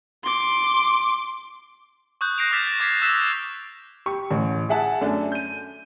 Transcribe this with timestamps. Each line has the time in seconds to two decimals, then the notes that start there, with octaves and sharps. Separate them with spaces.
0.24 C6 D6
2.21 C#6 D#6 F#6 G6
2.38 F#6 G6 A#6 C7 D7 F7
2.51 C#6 D6 F6 A6 B6 E7
2.67 A6
2.80 C#6 D6 G#6 B6 C7
3.02 E6 F#6 G#6 A#6 B6 E7
4.06 G4 C#6
4.31 A1
4.69 G#4 E5 F#5 A5
5.01 F#2 A3 D4
5.32 G6 D#7